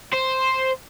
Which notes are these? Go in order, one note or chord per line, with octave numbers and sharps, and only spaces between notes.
C5